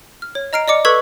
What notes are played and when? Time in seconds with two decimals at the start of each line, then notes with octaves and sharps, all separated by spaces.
0.22 F6
0.35 C#5
0.53 D#5 A#5 F6 C7 D7
0.68 D5 D#5 D6 C#7
0.85 A4 B4 C#6 E6 G#6 B6